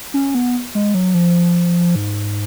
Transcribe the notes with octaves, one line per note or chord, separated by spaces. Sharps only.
C#4
B3
G#3
F#3
F3
G#2